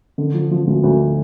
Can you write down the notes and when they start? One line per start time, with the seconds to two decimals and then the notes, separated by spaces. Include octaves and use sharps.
0.18 D3
0.34 F3
0.51 F3
0.67 D2
0.84 D2